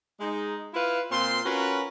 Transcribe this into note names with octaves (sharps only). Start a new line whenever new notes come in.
G#3 D#4
E4 F4 B4 F5
A#2 C4 F4 C6
C#4 F4 F#4 A#4 B4